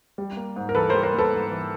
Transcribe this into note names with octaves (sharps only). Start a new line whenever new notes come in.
G3
A#3
G#2
A#4
E3 A4 B4
A#4 C5
G3
A#4 C5
A#3
A4 B4
G#2
E3